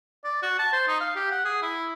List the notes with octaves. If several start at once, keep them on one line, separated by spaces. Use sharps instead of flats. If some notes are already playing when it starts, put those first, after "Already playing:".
D5
F#4
A5
C5
D#4
F5
G4
F#5
G#4
E4